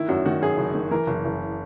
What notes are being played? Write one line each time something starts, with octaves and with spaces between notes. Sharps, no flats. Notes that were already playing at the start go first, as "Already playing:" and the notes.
Already playing: D#3 E4
F#2 F#4
D#3 F#4
F#2 G#4
F#1
D#3
E3 A#4
F#1
F#1